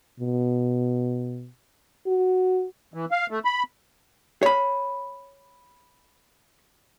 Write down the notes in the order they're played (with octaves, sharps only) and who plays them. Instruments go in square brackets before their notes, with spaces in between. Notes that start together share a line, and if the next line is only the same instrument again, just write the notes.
[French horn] B2
F#4
[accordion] E3
F5
A3
B5
[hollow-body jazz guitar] C#5 B5